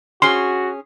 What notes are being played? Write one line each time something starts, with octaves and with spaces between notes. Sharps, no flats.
C#4 F#4 G#4 C6